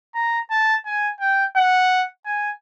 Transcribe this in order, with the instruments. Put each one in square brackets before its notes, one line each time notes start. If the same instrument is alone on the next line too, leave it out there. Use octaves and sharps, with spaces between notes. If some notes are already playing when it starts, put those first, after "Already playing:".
[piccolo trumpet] A#5
A5
G#5
G5
F#5
G#5